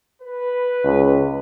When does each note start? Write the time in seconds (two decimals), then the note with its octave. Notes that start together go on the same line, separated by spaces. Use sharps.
0.22 B4
0.85 C#2